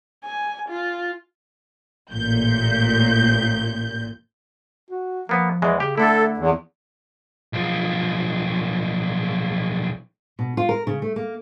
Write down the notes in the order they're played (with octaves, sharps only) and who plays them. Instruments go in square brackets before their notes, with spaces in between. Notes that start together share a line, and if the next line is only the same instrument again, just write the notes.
[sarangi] G#5
F4
[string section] A1 A#2 G6
[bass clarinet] F#4
[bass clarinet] F3 [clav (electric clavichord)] A#3 B3
[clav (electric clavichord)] E2 E3 G#3
[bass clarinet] C#3 [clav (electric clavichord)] G4
[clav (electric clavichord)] D3 E4 [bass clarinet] A3 [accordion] A4
[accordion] E2
[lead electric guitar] B1 F3
[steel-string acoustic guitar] B2
F4
A#4
C#3
A3
A#3